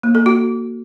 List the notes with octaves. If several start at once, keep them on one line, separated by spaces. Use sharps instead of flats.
A#3
A4
F#4